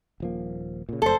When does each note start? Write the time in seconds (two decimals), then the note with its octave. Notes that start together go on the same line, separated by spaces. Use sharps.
0.20 D#1 F3 A#3
0.89 A#2 C#3
1.02 F#1 F2 A3 A4 C5